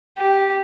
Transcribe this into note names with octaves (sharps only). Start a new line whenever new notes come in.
G4